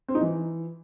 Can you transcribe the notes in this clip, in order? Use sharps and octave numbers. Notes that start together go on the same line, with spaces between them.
C4
D#4
E3